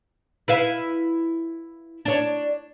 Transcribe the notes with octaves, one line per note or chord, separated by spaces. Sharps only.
E4 B4 F5
D4 C#5